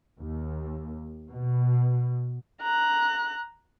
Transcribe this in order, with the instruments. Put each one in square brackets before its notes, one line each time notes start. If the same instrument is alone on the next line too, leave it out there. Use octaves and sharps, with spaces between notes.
[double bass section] D#2
B2
[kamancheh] A#5 F#6